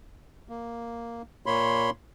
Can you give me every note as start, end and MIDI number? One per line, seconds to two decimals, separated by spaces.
0.49 1.22 58
1.46 1.90 46
1.46 1.90 58
1.46 1.90 73
1.46 1.90 83
1.46 1.90 84